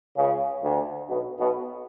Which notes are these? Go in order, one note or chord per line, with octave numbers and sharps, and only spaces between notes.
C#2 C#3
D2 D3
B1 B2
B1 B2